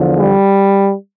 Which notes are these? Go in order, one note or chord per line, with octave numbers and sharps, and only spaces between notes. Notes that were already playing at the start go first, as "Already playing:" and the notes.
Already playing: E2 D3 F3
G3